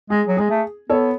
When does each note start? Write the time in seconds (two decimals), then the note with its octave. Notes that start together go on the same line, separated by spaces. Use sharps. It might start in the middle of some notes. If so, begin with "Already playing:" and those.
0.10 G#3 G#4
0.27 F#3
0.37 G#3 G#4
0.50 A3
0.89 B3 A4 C#5